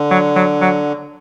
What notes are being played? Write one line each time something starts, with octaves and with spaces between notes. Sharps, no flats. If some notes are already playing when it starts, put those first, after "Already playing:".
Already playing: D3
F#3
F#3
F#3